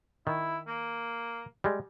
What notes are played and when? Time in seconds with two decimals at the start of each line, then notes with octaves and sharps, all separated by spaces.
0.27 D#3 E4
0.67 A#3
1.64 G3 G#3